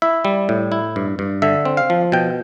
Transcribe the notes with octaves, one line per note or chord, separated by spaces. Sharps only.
E4 E5
G3
A2
E4
G2
G2
D3 E5
C4
F5
F3
B2 G5